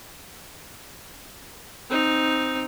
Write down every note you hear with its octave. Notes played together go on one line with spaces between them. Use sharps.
C4 D#4